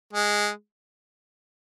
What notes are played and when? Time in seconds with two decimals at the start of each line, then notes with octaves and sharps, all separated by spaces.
0.13 G#3